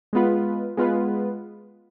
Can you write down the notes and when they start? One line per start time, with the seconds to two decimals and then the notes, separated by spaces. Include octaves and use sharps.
0.13 G#3 B3 F4 B4
0.77 G#3 B3 F4 B4